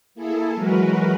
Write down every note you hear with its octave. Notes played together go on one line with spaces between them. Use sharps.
A#3 E4 G#4 A4
E3 F#3 G#3 F#4 A#4 B4